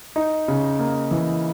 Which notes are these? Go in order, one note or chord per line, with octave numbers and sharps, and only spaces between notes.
D#4
C#3
A#3
E3